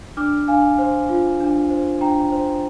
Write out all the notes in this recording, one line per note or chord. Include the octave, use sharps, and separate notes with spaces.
D4 D6 F6
D4 F5 G#5
C5
F4
D4
C5
D4 G5 A#5
C5